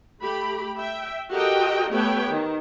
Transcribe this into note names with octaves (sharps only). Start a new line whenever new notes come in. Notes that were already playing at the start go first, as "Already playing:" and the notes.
A3 G4 B5
E5 G5
F#4 G4 A4 A#4 D#5 G5
A3 B3 G4 B4 C#5 G5
D#3